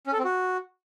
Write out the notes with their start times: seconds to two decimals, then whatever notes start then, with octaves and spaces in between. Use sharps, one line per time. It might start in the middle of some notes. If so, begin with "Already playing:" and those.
0.07 C#4
0.13 A4
0.19 C4
0.24 F#4